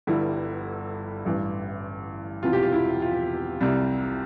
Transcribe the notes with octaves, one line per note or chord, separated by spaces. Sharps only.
G1 G2 D3 G3 E4
A1 G2 E3
E1 E2 C3 E3 F4
G4
F4
E4
F4
C2 C3 G3